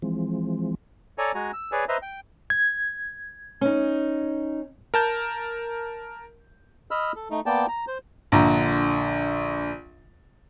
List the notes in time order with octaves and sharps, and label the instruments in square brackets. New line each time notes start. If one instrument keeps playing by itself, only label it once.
[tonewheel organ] E3 F3 G#3 C4
[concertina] A4 C#5 D5 G#5 A#5
G#3 F#4 G#5 A#5
E6
G#4 B4 C#5 D5 G#5
B4 C5 D#5 E5 A#5
G5
[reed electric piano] G#6
[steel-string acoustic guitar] C#4 D#4
[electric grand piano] A#4 A5 G6
[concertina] D#5 B5 E6 F6
A4
A3 D#4
A#3 B3 D5 G5 A5
A#5
C5
[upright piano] A#1 D3 A#5